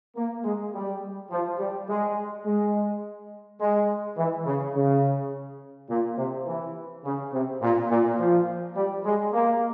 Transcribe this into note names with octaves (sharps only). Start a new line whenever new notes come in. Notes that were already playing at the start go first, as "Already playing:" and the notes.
A#3
G#3
G3
F3
G3
G#3
G#3
G#3
E3
C#3
C#3
A#2
C3
E3
C#3
C3
A#2
A#2
F3
G3
G#3
A#3